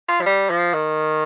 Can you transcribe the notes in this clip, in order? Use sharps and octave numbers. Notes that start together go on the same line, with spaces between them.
F4
F3
G3
F3
D#3